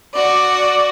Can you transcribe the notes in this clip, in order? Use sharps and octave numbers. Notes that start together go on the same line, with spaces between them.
F#4 D5